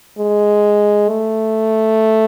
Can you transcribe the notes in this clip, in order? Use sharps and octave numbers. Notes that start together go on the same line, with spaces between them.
G#3
A3